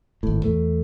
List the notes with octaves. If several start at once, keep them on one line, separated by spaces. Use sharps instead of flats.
G#1 A2
E2 A3